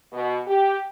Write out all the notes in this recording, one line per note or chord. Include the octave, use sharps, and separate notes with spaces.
B2
G4